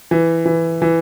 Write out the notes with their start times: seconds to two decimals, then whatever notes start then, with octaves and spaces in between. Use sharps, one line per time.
0.11 E3
0.46 E3
0.82 E3